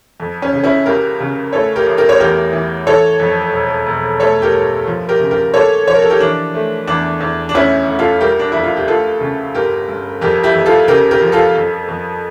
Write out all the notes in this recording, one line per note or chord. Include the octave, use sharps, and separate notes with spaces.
F2
C#4
C#3
C#4 E4
C#2 G4 A#4
C#3
A2 A4 C#5
G4 A#4
A1
G4 A#4
C#5
E2 G4 A#4
E3
E3 A4 C#5
F2
E1
E1
A3 A4 C#5
G4 A#4
G1
F3
G4 A#4
C#3
G4 A#4
A#3 A4 C#5
F3 C#5
A#4
A4
G4 A#4
E3 D4
A3
E2 D4
E2
D4
D2 C#4 E4
D2
F4 A4
G3 G4 A#4
D4
F2 E4
F4
G4
D2 F4 A4
C#3
G1 G4 A#4
G1
F2 G4 A#4
E4 G4
F2
F4 A4
C#3 G4 A#4
G4 A#4
F3
F4 A4
F2
F2